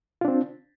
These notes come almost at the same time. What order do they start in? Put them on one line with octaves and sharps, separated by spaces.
F4 D4 C4